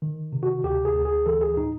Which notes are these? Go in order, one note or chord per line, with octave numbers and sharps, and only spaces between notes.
D#3
C3
F#4
D2 G4
G#4
D2
G#4
E3 A4
G#4
A2 D#4